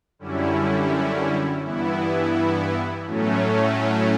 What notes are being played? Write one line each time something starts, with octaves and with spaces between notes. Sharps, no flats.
F#2 D3 G3 C#4 E4
G2 E3 B3 E4
A2 F#3 A3 C#4